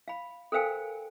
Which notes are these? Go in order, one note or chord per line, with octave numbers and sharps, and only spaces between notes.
F5 B5
A4 A#4 C5 F5 G5 G#5